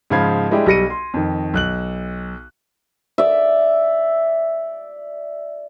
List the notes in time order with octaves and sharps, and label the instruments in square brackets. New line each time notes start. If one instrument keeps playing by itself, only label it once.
[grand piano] G#2 C#3 F3 F5 B5 G#6
G3 G#3 D4 E4 G4
B1 G3 A#6 C#7 D#7
C6
F2 D#3
B1 F#6 F#7
[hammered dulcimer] D5 E5